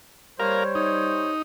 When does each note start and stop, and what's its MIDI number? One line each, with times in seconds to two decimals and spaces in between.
0.40 1.32 55
0.40 0.64 70
0.40 1.32 72
0.40 1.32 73
0.40 0.64 77
0.75 1.42 63